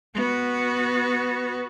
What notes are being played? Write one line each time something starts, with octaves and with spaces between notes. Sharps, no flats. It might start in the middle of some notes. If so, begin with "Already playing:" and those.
B3 F#4